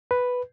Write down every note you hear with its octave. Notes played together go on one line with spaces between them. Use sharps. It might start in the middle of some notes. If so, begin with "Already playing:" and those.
B4